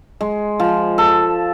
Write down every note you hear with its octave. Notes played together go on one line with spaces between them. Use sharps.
G#3
F3
A4